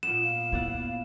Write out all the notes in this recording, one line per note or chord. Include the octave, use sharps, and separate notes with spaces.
A#2 B3 E7
F5
B3 E4 D5 F#5